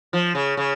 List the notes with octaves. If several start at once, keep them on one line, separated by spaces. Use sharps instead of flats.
F3
C#3
C#3